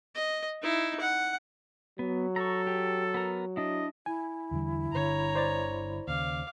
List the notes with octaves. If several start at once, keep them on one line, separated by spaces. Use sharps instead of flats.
D#5
D#4 E4
F#5
F#3 B3
A4 A#5 C#6
G4
B3 A#4
D4 E4 D#5
E4 G#5
E2 D3 G3
G1 D3 C#5 A#5
C5 D5 A6
D#2 C#3 F5 D6